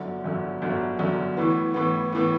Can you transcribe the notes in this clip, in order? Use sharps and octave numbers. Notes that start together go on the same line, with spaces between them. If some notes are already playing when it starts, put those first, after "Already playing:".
Already playing: G1 F#2 D3
G1 F#2 D3
G1 F#2 D3
G1 F#2 D3
A2 E3 B3
A2 E3 B3
A2 E3 B3